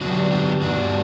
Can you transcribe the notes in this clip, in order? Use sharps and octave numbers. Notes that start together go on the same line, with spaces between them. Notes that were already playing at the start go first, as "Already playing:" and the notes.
D3 F#3 B3 D4 F#4
G4
F#4
G4
G2 D#3 G3 B3 D4 F#4